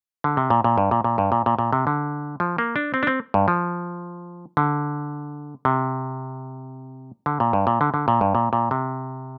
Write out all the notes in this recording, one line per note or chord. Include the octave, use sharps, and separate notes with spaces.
D3
C3
A#2
A#2
G2
A#2
A#2
G2
A#2
A#2
A#2
C3
D3
F3
A#3
D4
C4
D4
C4
G2
F3
D3
C3
D3
A#2
G2
A#2
D3
D3
A#2
G2
A#2
A#2
C3